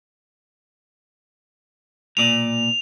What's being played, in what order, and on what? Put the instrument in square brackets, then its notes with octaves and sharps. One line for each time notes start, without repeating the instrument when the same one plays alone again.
[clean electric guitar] B1 A#2 D5 [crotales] F7